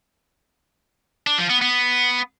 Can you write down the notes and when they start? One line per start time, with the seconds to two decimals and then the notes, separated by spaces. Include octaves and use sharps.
1.27 D4
1.38 F3
1.50 B3
1.62 B3